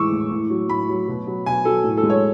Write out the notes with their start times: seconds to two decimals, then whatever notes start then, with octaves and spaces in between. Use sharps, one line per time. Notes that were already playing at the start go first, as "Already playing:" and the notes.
Already playing: A2 E3 G#3 C#6 D6 E6
0.12 A2
0.31 A2
0.50 F#3
0.69 A2 B5
0.89 F#3
1.08 B2
1.27 F#3
1.46 B2 G#5
1.65 F#3 A4
1.84 A2
1.97 A4
2.03 G#3
2.10 C#5